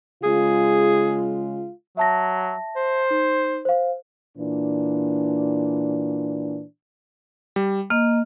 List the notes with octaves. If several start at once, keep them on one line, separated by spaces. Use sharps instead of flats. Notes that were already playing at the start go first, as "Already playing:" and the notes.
C#3 G#3 F4 G#4
F#3 E5 A5 A#6
C5
D#4
C5 F5
A#2 E3 D4
G3
A#3 D#5 F6